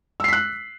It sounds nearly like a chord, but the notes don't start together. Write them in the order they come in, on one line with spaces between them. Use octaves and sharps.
E6 C7 B6 F#6